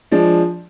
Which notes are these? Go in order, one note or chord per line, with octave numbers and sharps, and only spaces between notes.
F3 G#3 D4